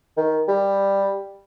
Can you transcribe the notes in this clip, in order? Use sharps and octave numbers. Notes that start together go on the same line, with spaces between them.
D#3
G3